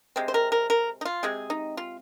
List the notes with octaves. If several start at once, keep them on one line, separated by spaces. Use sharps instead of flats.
C3 G#3 C4
C5
A#4
A#4
A#4
D#4
F4
C3 G#3 C4 G#4
D#4
F4